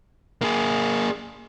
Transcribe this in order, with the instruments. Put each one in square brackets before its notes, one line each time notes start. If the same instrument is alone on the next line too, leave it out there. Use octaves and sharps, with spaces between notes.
[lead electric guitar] A#3 G#4